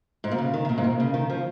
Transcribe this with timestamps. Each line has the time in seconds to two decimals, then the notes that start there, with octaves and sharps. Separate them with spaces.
0.24 G#2
0.32 A#2
0.38 C#3
0.54 D#3
0.65 C#3
0.69 A#2
0.78 G#2
0.84 A#2
1.00 C#3
1.14 D#3
1.30 F3